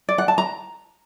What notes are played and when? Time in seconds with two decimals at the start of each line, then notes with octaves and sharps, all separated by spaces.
0.09 D5
0.18 F#5
0.28 A5
0.38 A#5